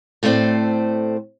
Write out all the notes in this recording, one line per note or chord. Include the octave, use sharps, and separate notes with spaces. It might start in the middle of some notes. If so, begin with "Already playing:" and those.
A2 A3 C4 C5 D5